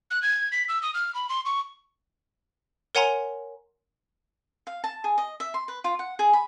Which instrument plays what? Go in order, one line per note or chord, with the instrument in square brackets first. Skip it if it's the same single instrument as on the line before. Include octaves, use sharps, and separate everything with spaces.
[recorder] F#6
G#6
B6
E6
D#6
F6
B5
C6
C#6
[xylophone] A#4 C#5 F#5 G#5 A#5 C6
[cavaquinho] F5
A5
G#4
D#5
E5
C6
B4
F4
F#5
G#4
B5